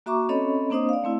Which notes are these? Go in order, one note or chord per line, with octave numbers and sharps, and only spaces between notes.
A#3 F#4 E5 A#5 C#6 D6
C4 C#4 A4 C#5 D#5 B5
A#3 C4 D4 C5 D#5 D#6
D5 F5
A3 C4 E4